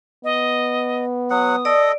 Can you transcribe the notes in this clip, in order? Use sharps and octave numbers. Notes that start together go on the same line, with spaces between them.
B3 D#5
F#3 F#5 D#6
A4 D5 D#5